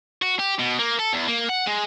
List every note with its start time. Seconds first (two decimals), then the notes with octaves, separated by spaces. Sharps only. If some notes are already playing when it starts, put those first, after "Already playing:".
0.22 F#4
0.39 G4
0.59 B2
0.79 A#3
0.99 A4
1.13 E2
1.27 A#3
1.48 F#5
1.67 G#3